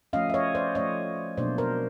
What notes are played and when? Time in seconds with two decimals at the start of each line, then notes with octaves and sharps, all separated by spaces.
0.13 F3 A3 C#4 D#5 F5
0.29 E5
0.34 C#5 D#5
0.55 C5 D5
0.75 F3 A3 C#4 C#5 D#5
1.37 B2 F#3 A#3 D4 C5 D5
1.58 A#4 C5